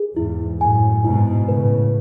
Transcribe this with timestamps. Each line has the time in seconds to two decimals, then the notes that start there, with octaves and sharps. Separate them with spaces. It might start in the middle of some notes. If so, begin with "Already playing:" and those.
Already playing: G#4
0.16 E2 G#2 E4
0.61 F#2 A2 G#5
1.04 G#2 B2 E4
1.49 A2 C#3 B4